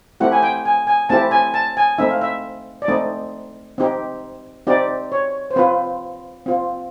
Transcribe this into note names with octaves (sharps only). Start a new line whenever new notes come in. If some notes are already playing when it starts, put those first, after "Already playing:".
A3 C4 E4 G4 F#5
G#5
G5
G#5
G#5
A3 C4 E4 G4 A5
G#5
A5
G#5
A3 C4 D#4 E5
F5
E5
D5
A3 C4 D#4 D#5
C4 D#4 G4
C4 D#4 G4 D5
C#5
C5
C4 F4 B4
C4 F4